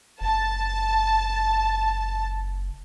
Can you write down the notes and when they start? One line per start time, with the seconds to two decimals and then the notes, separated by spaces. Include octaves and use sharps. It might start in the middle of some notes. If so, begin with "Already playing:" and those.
0.21 F#1 A5